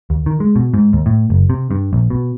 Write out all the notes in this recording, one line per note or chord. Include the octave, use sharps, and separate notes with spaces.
D#2
D#3
G#3
B2
G#2
D#2
A2
F#1
C3
G2
A#1
B2